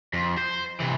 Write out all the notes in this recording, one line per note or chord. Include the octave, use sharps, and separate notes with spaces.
F2
C5
C3 E3